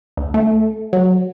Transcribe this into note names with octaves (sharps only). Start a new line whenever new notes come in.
D2
A3
F#3